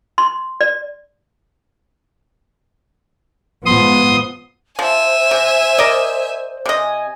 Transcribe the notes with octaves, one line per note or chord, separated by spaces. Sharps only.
C6
D5
G#2 F3 B3 C6 D#6
F3 C5 E5 G#5
C3
A#4 D5 D#5
C3 D#5 G#5